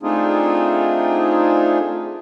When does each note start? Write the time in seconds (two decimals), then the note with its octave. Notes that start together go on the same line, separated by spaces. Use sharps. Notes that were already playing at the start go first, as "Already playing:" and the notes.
0.03 A3 C4 D4 D#4 F4 G#4